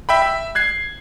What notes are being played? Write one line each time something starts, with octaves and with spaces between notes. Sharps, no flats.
E5 G5 B5
E5
F#6 G#6 C7